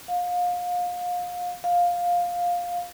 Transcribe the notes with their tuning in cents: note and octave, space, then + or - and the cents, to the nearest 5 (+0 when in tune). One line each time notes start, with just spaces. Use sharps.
F5 +30
F5 +10